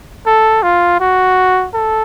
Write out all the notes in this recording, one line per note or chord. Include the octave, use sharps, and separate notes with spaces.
A4
F4
F#4
A4